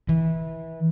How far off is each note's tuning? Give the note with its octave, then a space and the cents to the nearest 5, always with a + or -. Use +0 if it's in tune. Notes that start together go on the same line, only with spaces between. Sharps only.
E3 -20